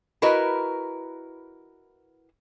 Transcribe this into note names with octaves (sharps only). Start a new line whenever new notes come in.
E4 F#4 A#4 B4 D#5